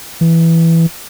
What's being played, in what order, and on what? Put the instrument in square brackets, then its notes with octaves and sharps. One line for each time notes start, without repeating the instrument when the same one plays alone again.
[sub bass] E3